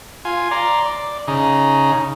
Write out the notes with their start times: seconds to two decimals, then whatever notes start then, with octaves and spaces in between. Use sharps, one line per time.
0.25 F4 G#5
0.51 D5 A#5 C6
0.85 D5
1.27 C#3 D#4